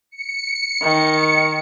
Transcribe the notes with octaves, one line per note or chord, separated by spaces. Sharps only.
C#7
D#3